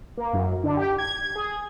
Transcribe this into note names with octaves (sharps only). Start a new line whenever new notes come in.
A#3
F#2
D3
G4
G#6
G#4